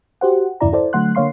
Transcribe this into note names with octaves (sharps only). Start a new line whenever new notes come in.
F#4 G4 C5 F#5
E2 G2 C#3 E4 D5 A#5
E4 A4 C5 D5
D3 F#3 A3 F#5 C6 F#6
D3 A#3 C#5 F5 C6 C7